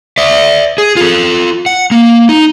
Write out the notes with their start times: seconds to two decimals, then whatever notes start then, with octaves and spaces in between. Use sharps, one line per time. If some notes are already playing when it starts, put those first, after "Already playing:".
0.18 D5 E5
0.78 G#4
0.97 F4 A4
1.66 F#5
1.91 A#3
2.29 D#4